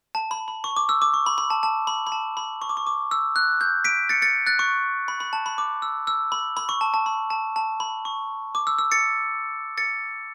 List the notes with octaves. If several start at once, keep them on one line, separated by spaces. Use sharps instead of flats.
A5
B5
B5
C#6
D6
E6
D6
C#6
B5
B5
A5
A5
B5
B5
A5
B5
C#6
D6
C#6
D6
E6
F#6
G6
B6 D7
A6 C#7
A6 C#7
F#6 A6
C#6
B5
B5
A5
B5
D6
E6
E6
B5
B5
C#6
A5
A5
B5
A5
A5
B5
C#6
D6
E6
E6
A6 C#7
A6 C#7